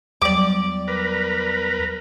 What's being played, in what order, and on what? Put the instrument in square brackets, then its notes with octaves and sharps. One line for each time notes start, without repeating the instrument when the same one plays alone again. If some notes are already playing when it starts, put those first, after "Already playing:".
[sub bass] E2 [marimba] F#3 G3 [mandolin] D5 D6
[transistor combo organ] A#4 B4